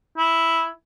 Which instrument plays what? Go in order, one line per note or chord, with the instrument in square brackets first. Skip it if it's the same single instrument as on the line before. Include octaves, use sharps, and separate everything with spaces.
[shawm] E4